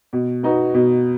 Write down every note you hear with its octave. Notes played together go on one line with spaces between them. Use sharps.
B2
B3 D#4 F#4
B2